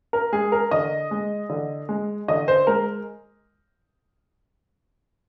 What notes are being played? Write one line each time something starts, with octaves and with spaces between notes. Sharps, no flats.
A#4
G#3 G#4
A#4
D3 D#5
G#3
D3
G#3
D3 D#5
C5
G#3 A#4